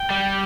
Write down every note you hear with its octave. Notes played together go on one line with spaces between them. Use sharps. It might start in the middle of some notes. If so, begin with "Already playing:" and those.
Already playing: G5
G3